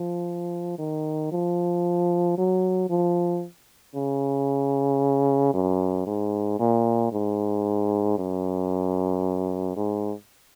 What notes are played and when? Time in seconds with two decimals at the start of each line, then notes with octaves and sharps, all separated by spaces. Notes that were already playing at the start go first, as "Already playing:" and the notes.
Already playing: F3
0.79 D#3
1.32 F3
2.38 F#3
2.90 F3
3.96 C#3
5.54 F#2
6.07 G#2
6.60 A#2
7.12 G#2
8.18 F#2
9.76 G#2